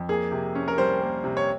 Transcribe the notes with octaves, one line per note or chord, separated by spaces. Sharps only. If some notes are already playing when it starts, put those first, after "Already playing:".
Already playing: F2
A#3 G#4
C3
C#4
A#4
G3 C5
A#3
C3
C#5